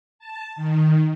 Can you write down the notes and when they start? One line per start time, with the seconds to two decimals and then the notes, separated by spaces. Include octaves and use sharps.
0.19 A5
0.56 D#3